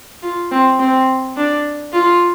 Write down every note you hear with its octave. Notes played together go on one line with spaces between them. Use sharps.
F4
C4
C4
D4
F4